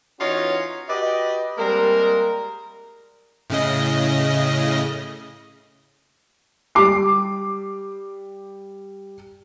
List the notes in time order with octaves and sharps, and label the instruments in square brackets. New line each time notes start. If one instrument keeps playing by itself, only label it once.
[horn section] E3 C#4 D#4 F4 F#4 C#5
F#4 G4 B4 D5 D#5
G3 G#3 A#3 C4 A#4
[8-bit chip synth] A2 C#3 D#5
[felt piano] G3 D6 C7